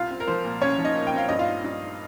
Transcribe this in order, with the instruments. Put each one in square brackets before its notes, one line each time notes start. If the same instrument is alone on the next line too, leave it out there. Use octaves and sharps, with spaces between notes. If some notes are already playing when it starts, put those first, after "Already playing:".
Already playing: [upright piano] C2 F4 F5
C4
A#4
F3 C5
A#2
C2 C#4 C#5
F3
D#4 D#5
A#2
G5
C4 F5
G2 D#5
F4 F5
D#4
G2
D#4